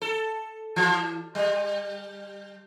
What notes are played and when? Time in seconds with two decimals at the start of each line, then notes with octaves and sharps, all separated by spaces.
0.02 A4
0.76 E3
1.35 G3